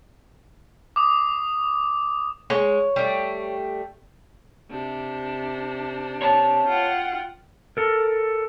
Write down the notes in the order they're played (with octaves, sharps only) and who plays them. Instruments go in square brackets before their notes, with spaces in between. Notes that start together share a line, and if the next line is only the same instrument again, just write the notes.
[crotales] D6 D#6
[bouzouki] G#3 [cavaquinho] C#5
[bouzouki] G3 A3
[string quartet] C3 D4
[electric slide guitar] C#5 A5
[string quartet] F4 F#5 G5
[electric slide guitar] A4 A#4